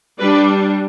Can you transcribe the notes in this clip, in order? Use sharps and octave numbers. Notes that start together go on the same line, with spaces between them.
G3 D4 B4 D5